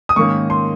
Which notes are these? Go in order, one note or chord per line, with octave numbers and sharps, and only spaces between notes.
D#6
G#2 D#3 A#3 C#4 C#6
C6